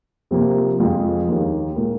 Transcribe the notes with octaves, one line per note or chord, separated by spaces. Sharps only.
C3 F3 A#3
F2 F3 G#3 F4
D#2 D#3 A#3
A#2 G#3 F4 A#4